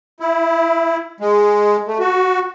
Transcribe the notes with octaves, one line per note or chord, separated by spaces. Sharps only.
E4
G#3
A3
F#4